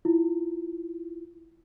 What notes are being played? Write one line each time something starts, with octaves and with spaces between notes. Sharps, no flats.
E4 F4